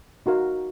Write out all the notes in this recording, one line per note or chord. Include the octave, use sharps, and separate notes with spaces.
D#4 F#4 A#4 F5